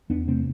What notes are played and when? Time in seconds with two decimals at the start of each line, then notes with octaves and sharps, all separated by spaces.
0.10 E2 B3 D4
0.27 C3 A3 C4